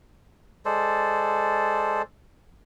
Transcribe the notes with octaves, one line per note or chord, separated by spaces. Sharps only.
G#3 A4 C5 D5